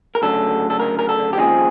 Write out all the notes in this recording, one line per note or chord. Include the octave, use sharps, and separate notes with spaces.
A#4
D2 C#3 F#3 A4
A4
A#4
A#4
A4
G4
D#2 C#3 F3 G#3 C4 G#4